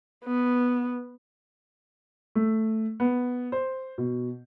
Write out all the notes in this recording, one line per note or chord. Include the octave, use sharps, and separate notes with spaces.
B3
A3
B3
C5
B2